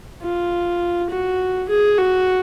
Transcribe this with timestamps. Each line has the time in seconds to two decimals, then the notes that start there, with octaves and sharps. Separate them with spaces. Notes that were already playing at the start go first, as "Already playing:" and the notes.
0.23 F4
1.11 F#4
1.69 G#4
1.98 F#4